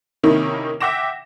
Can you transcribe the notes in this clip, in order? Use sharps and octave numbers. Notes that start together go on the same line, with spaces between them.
C3 D#3 A#3 C#4 D#4 E4
E5 F#5 G5 D6 A#6 E7